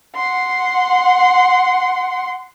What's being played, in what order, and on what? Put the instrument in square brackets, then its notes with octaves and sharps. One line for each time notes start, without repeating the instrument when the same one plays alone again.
[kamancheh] F#5 C6